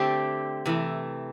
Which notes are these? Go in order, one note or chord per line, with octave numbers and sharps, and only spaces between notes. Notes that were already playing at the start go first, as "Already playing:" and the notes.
Already playing: D3 A3 C4 G4
C3 E3 A3